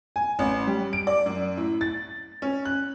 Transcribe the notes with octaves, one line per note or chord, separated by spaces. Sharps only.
G#5
A1
G3
D7
D5
F#2
A2
A6
C#4
F#6